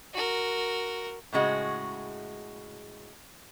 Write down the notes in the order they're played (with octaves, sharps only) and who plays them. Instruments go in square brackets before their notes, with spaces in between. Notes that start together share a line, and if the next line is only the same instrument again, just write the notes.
[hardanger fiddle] F#4 A#4
[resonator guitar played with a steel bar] A2 C#3 G#3 F#4